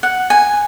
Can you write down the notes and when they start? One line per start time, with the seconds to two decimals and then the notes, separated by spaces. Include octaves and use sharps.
0.03 F#5
0.30 G#5